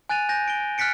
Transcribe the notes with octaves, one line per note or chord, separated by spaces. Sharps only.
G#5 F#6 A6 D#7 F7
G#5 G6 A#6
D7 G7
F6 F#6 A6 B6 C#7 D7